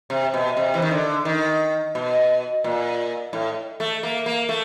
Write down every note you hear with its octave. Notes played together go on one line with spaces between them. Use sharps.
C3
B2
C3
E3
D#3
D3
D#3
B2
A#2
A2
A3
A#3
A#3
A3